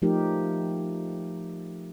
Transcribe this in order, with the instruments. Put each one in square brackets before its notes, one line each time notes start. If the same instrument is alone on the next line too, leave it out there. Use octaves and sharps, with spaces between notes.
[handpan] F3 A3 D#4 G4 A#4